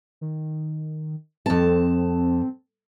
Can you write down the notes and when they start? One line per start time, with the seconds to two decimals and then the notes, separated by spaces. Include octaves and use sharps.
0.21 D#3
1.46 F2 C4 A5